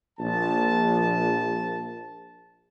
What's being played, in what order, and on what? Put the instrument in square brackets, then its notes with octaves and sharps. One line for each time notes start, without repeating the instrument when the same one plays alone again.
[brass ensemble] A#1 A5